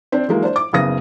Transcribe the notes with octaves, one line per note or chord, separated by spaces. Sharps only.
C4 D4
E3 F#3 G#3 A#3
D4 C5
D6
F#1 C#3 B3 D#6 A#6